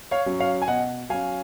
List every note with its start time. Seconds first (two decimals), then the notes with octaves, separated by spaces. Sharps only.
0.11 C#5 F5
0.26 F#3 C#4
0.39 C#5 F5
0.62 G#5
0.68 B2 D#5 F#5
1.09 F#3 C#4 F5 G#5